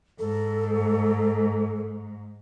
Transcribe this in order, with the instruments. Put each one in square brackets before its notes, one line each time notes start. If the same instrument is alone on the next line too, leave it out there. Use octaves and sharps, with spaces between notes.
[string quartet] G#2 [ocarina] A4